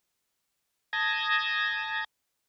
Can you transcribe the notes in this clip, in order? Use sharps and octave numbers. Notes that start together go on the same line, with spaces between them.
A5 D#6 G#6 A#6